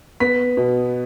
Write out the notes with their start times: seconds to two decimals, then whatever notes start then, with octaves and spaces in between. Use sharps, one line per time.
0.20 B3 B6
0.57 B2